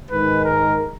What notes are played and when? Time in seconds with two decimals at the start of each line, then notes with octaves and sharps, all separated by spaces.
0.11 G#2 D#3 G#3 B4
0.45 A#4